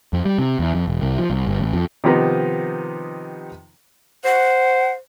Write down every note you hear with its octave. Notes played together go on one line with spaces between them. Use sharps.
F2
G3
C3
E2
F2
E1
C2
F3
C2
G1
A1
F2
C3 D#3 F3 B3 D#4
C5 F#5